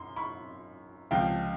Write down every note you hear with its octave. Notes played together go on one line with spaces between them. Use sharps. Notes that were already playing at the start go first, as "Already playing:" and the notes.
Already playing: F#2 C6
B5 C#6
C#2 C3 F3 F5 G5